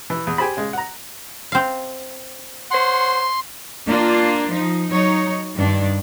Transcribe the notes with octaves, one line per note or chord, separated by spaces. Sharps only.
E3
E2
G4 G#4 C5 B5
C#3 G#3
F#5 A#5
C4 F5
C5 C#5 F#5 C6
A#3 D4 F4
F3 D#4
F#3 D#4 C#5
G2 D#3 D4